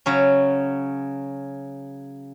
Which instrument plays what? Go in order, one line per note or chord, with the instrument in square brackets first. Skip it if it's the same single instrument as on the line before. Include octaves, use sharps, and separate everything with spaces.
[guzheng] C#3 F#3 C#4